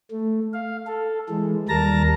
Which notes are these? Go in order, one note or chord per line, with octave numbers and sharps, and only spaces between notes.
A3
F5
A4
E3 G#3
D#2 G3 A#4 A5 A#5 A#6